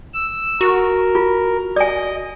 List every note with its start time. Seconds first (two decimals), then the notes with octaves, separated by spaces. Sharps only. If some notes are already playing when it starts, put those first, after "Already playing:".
0.14 E6
0.61 F#4 A#4
1.15 F4
1.76 D5 D#5 G#5